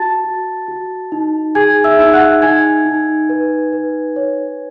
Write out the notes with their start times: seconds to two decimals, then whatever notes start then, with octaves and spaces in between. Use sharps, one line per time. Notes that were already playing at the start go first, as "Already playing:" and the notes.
Already playing: F#4 A5 A6
0.25 F#4
0.68 F#4
1.12 D#4
1.55 G#4 G#5 G#6
1.84 E5 E6
1.99 D#4
2.13 F#5 F#6
2.42 D#4 G#5 G#6
2.86 D#4
3.29 B4
3.73 B4
4.16 C#5